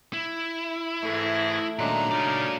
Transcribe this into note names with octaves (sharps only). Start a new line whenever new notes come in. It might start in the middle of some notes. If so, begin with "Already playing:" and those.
E4
G#2 E3 A3 G#4 E5
A#2 D#3 F#3 G#3 D4 A#5 F#6
C#3 D#4 F4 A#4 D5